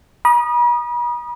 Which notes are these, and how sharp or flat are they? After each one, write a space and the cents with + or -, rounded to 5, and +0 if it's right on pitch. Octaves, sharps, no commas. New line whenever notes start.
B5 -45 D#6 -20